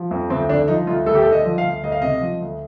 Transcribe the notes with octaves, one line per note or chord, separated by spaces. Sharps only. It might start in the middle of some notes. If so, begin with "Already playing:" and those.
Already playing: F3
F2
D2 C4
D3 D4
F3 D#4
D2 F4
D2 A4
G4
A4
D3
D#5
F3
F5
D2
D2 D#5
F5
C3 D#5
F3
D2